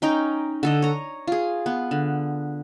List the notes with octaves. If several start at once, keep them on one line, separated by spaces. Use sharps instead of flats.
C#4 D#4 G5 A#5
D3 A4 D#5
C#5 A#5
F4 G#4
B3
D3